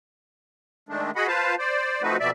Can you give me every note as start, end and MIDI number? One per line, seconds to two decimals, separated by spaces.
0.89 1.11 51
0.89 1.11 56
0.89 1.11 57
0.89 1.11 62
1.16 1.27 66
1.16 1.27 68
1.16 1.27 75
1.16 1.27 78
1.16 1.27 83
1.27 1.55 65
1.27 1.55 71
1.27 1.55 72
1.27 1.55 77
1.27 1.55 81
1.59 2.02 72
1.59 2.02 74
2.02 2.17 53
2.02 2.17 57
2.02 2.17 60
2.02 2.17 63
2.02 2.17 66
2.02 2.17 71
2.20 2.30 41
2.20 2.30 47
2.20 2.30 74
2.20 2.30 76